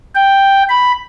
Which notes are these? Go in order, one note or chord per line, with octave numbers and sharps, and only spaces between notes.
G5
B5